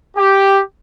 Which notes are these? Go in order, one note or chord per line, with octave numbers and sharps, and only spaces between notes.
G4